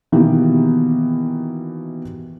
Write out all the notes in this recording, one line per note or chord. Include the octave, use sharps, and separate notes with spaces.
B2 D#3 E3 A#3 E4 G4